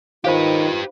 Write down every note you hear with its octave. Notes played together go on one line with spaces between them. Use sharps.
D#3 D#4 F4 G4 B4 C5 F5